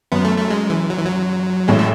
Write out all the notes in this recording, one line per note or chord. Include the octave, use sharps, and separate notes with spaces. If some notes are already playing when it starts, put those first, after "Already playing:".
F#2 B3
A3
A3
G#3
E3
F#3
E3
F#3
A1 A2 G#3
A3